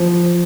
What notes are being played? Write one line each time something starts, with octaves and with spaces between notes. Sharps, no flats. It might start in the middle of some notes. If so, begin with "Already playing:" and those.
Already playing: F3